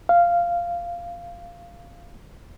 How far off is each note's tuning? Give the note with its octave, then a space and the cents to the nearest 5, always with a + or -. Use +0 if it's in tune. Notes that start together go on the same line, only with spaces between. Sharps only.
F5 -10